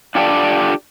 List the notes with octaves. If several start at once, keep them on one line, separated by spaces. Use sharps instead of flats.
D4 F4 G4 A4 C5 D5